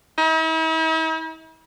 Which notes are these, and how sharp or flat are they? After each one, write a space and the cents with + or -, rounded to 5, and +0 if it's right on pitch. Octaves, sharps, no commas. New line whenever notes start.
E4 -45